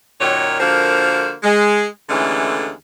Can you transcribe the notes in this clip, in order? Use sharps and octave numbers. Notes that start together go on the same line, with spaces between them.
F#2 A#2 D#3 F#3 C#5
D3 F3 A#3 F#4 A#4 C5
G#3
D#2 D3 E3 G#3 A3 C#4